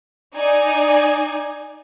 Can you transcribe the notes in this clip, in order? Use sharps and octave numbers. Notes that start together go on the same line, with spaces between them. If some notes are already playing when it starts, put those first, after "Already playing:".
D#4 D5 G#5